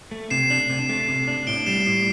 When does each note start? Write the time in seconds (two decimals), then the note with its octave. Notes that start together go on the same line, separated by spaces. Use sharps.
0.11 A3
0.30 C3 C7 E7
0.50 D4
0.70 C3
0.89 A3
1.09 C3
1.28 D4
1.47 A2 D7 G7
1.66 G3 C7 E7
1.86 A2 C7